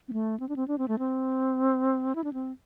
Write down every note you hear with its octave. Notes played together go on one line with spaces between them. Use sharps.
C4
A3
C4
D4
C4
D4
C4
A3
C4
E4
D4
C4